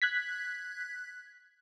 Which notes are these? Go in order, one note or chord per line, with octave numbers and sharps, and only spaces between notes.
F#6 G#6 B6